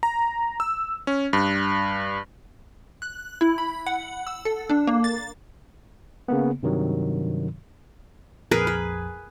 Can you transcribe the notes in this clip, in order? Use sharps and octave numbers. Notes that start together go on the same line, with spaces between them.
A#5
E6
C#4
G2
F#6
E4
B5
F#5
E6
A4
D4
A#3
A6
C#3 A#3 B3
G2 C3 D#3 F#3
A#1 F2 G#4 A#4 B4
B4